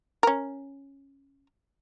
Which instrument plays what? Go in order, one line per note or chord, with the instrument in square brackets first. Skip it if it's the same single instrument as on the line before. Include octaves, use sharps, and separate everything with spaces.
[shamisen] C#4 A#4